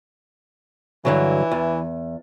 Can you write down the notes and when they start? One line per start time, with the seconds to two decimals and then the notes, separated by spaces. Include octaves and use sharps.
1.05 G2 D3 E3 F#3
1.51 E2